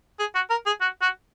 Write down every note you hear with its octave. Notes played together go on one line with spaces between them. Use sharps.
G#4
F#4
A#4
G#4
F#4
F#4